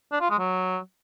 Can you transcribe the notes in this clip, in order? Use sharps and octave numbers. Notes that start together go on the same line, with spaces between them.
D4
F4
G#3
F#3